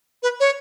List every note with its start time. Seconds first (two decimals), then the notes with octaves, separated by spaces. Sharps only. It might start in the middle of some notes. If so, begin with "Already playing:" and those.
0.23 B4
0.40 C#5